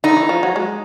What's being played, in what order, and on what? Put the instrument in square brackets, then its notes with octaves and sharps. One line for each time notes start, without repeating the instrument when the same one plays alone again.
[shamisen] D3 [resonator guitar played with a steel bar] D#4
[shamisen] E3
F3
F#3
G#3